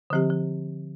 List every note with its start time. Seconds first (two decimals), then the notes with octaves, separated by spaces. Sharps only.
0.10 D3 F3 C4 G4
0.30 F3